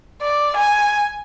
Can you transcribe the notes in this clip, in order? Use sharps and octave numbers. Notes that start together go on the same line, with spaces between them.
D5
G#5